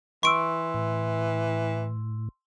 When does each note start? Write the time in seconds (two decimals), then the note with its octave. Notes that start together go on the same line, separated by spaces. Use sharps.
0.23 E3 C6 C#6 E6 D7
0.74 A2